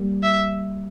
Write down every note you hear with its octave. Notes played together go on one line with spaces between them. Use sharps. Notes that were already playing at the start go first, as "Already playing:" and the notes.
Already playing: G3 A#3
E5